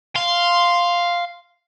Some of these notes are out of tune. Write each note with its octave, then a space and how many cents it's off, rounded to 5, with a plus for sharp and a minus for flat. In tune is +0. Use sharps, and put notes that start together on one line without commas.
F5 +0 C6 +0